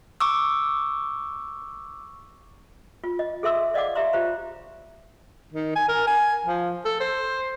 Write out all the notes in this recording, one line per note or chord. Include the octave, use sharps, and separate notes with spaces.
C#6 D6 E6
F4
D#5
G#4 A4 E5 C6 E6
D5 D#5 F5 F#5 D6
G4 E5 A#5 C6
F4 G4 C5 A#5
D#3
G#5
A#4
G#5
F3
A4
C5